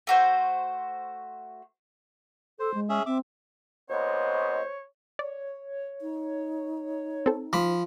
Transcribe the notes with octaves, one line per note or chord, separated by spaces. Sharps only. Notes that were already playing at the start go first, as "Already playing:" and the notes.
A3 F#4 C5
A4 C5
G#3
C#4 G#4 E5
C4 E5 D6
A#2 C#3 B3 C5 C#5 D#5
C#5 D5
D#4
C4 A4
F3 C5 B5 D6